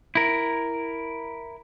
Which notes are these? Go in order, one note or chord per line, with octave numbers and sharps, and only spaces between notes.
E4 A#4